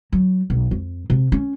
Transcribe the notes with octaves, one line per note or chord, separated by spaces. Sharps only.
F#3
B1
F2
C3
C#4